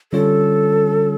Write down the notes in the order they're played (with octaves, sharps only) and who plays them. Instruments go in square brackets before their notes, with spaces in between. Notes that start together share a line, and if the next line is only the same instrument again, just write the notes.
[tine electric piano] D3 G3 C#4 F4 C#5 [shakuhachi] A4